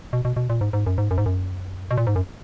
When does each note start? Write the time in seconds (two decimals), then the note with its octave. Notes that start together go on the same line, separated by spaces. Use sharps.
0.13 B2
0.25 B2
0.36 B2
0.50 A#2
0.61 G#2
0.73 G#2
0.86 F#2
0.98 G#2
1.11 F#2
1.18 G#2
1.26 F#2
1.91 B2
1.97 A#2
2.07 G#2
2.16 F#2